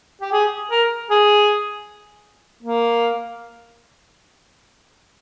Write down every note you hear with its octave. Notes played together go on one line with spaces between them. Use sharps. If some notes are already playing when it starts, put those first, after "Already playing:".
G4
G#4
A#4
G#4
A#3